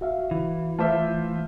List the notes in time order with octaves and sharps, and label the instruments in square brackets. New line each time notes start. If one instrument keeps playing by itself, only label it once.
[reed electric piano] F#4 E5 F5
[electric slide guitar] E3
[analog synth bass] A3 [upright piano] F4 C5 E5 [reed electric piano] A5 D6 F6